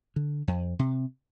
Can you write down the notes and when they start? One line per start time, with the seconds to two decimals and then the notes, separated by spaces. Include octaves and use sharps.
0.16 D3
0.48 F2
0.79 C3